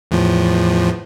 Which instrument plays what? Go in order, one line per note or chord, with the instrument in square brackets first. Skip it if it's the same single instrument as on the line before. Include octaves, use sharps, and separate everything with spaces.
[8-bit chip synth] E2 A2 F3